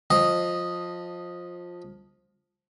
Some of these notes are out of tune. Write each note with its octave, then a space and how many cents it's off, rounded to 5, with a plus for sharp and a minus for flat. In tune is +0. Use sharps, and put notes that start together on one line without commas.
F3 +15 D#5 +0